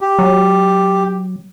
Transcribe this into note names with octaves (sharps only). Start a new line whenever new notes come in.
G4
F#3